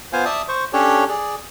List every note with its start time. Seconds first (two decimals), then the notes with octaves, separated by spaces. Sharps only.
0.13 B3 F4 C5 F5 G#5
0.25 D5 E5 A5 D#6
0.48 C5 C#6
0.73 C#4 D4 G4 A4 C#5
1.09 G#4 D5